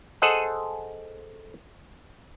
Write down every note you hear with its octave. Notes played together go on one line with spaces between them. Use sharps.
G#4 A4 C5 D#5 F#5